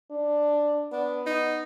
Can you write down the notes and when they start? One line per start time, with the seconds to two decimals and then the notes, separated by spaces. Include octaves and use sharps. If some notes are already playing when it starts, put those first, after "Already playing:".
0.11 D4
0.92 B3 D4
1.26 D#4